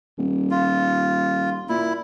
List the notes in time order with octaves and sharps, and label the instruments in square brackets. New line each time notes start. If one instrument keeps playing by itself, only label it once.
[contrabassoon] D#1
[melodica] F4
[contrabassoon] A#2 [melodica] E4